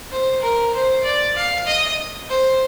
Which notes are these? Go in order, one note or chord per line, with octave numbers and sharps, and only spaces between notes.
C5
A#4
C5
D5
F5
D#5
C5